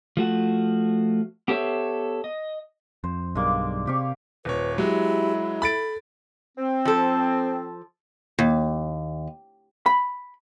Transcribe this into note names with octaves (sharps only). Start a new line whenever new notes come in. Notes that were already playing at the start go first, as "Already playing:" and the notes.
F3 A3 F#4
B3 G4 A4 C5 C#5 E5
D#5
F2 C5
B1 G2 G#3 A#3 D5
C3 C4 G4 F5 C#6
D#1 B4 C#5
F#3 G#3 E4 G4
A4 B5 A6 D7
C4
F3 A4
D#2
B5